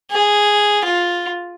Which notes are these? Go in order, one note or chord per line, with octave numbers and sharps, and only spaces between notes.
G#4
F4